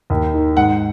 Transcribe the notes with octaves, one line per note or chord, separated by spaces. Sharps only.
D#2
D#3
G#2 F#5